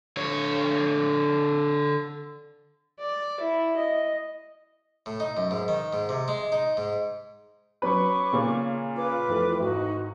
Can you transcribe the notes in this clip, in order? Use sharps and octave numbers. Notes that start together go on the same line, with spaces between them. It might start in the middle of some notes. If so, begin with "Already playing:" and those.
D3 C#5
D5
E4
D#5
A2
D#4
F#2
G#2
D#3
G#2
C3
G#3
D#4
G#2
F#3 C#4 B4 C#6 D6
A#2 C#3 C#5
F4 B4 D6
F2 E3 A3
G#1 D#3 D#4 F#4